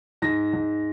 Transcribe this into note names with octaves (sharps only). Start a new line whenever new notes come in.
G#2 A#6
G#2